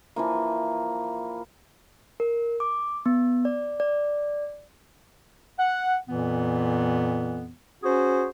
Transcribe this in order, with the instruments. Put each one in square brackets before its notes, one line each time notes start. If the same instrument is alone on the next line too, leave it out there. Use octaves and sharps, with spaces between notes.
[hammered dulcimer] E3 F3 A#3
[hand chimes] A#4
D6
B3
D5
D5
[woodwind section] F#5
F2 A#2 E3 B3
C#4 F#4 G#4 C5